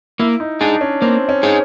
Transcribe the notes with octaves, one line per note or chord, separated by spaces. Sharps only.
A#3 E4
D#4
D4 D#4 G#4
C#4
A#3 C4
C#4
D#4 G#4